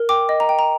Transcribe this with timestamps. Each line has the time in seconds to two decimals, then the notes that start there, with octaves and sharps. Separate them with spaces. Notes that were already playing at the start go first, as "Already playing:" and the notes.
Already playing: A#4
0.09 G5 D6
0.29 D#5
0.40 A#5
0.49 G5
0.59 A#5